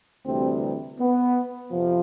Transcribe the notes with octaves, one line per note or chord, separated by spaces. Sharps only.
D2 C3 E3 G3 C4
B3
F2 C3 F3